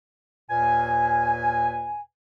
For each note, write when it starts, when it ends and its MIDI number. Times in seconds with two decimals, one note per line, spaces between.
0.50 2.00 39
0.50 2.00 46
0.50 2.00 71
0.50 2.00 80